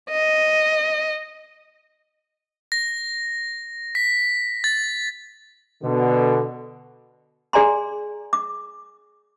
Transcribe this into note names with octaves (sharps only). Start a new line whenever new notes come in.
D#5
A#6
B6
A6
B2 D3
G#4 D5 G#5 A#5 C6
D6